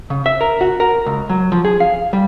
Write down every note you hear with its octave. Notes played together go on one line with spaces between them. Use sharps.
C#3
E5
A#4
F#4
A#4
C#2
F#3
F3
G#4
F5
G3